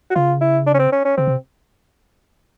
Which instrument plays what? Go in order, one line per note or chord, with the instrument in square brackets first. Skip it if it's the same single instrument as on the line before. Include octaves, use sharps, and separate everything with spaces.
[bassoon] F#4
[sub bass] C#3 [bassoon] F4
[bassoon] E4
D4
C#4
C4
C#4
C#4
[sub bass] C#3 [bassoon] C4
[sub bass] C3